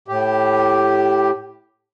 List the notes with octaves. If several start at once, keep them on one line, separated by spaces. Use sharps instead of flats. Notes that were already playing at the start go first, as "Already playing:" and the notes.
A2 G4